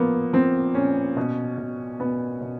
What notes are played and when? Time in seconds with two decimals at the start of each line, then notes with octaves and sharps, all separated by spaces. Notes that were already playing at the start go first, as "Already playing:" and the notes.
Already playing: A#2 F3 A#3 B3
0.33 F3 C4
0.75 A#2 C#4
1.17 B2
1.58 B2
2.00 B2 B3
2.41 B2